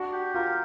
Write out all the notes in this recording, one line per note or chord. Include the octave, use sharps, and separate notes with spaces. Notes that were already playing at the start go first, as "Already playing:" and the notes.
Already playing: D4 F#4
G4
F4 A#4